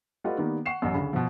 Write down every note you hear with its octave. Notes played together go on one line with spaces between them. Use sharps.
G3 A3 F4 B4 D#5 F#5
D#3 G3 A#3 B3
F#5 C#6 C7 E7
A1 F#2
D2 C#3 B5
B2 F3